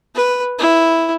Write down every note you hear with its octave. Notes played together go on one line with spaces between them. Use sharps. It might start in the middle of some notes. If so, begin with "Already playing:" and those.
B4
E4